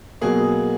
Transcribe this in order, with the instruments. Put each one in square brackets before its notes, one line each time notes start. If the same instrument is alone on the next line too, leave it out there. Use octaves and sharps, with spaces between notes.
[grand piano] B2 F#3 A#3 G#4